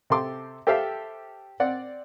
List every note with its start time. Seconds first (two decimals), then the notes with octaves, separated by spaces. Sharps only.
0.10 C3 G4 A4 C6 D6
0.67 G4 A4 C5 E5 F5 G5
1.60 C4 D5 F#5